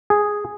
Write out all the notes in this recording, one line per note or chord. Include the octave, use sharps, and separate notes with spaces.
G#4